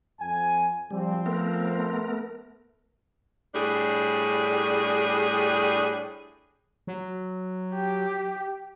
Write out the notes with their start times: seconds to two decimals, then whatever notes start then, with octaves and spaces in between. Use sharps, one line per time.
0.20 F2 G#5
0.91 F3 G3 C4
1.26 A3 B3 A#4
3.55 A2 G3 D4 G#4
6.87 F#3
7.75 G4